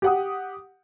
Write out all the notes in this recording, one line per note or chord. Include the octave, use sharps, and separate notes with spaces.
G4 F#5 D#6